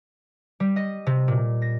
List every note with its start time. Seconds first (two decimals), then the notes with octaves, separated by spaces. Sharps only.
0.60 G3
0.76 D#5
1.07 C3
1.28 A#2
1.62 A#6